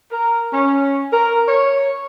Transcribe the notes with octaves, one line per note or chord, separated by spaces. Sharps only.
A#4
C#4
A#4
C#5